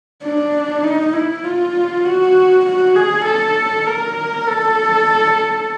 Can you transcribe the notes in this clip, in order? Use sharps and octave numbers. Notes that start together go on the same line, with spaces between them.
D4
D#4
E4
F4
F#4
F#4
G#4
A4
A#4
A4